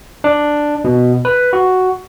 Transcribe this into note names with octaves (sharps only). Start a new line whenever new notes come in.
D4
B2
B4
F#4